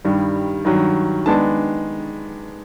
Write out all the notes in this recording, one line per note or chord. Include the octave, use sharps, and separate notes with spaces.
G2 D#3 G3
G2 D#3 F#3
D#3 G#3 B3 D4 A5